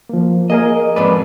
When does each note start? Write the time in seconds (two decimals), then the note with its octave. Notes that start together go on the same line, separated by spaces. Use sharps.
0.09 F3 A#3
0.50 A#3 G#4 A#4 D#5
0.96 F2 G#2 B4 D5